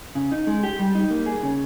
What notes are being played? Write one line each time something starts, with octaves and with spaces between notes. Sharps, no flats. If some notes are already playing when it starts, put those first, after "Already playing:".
C#3
D#4
G#3
G4
G3
D#4
A#3
G#4
C#3